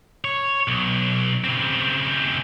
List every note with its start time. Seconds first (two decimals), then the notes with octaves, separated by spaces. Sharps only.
0.24 C#5
0.68 B1
1.44 C#3 C4